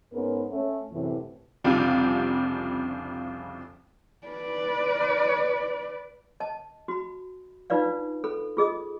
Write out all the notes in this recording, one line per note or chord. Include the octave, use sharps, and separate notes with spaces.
G#2 B3 C#4 A#4 B4
A3 C#4
F#2 A2 C3 E3
F1 C2 C#3 D4 F4 G4
B4 D5
D#5 A5
F#4 B5
D4 D#4 F4 B4 D5 F5
A4 B5
F4 G#4 D#5 D#6